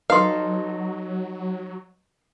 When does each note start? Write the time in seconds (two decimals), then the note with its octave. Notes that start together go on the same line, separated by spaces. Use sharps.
0.10 F#3 D#4 A4 B4 F5 C6